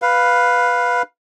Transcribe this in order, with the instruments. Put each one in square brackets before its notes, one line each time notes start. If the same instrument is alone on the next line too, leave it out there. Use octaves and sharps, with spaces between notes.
[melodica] B4 F5